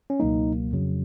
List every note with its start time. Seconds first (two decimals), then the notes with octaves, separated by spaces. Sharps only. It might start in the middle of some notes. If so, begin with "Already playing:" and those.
0.10 C#4
0.20 C#2 B2 F#3 A#3 D#4
0.73 F2 C#3 F#3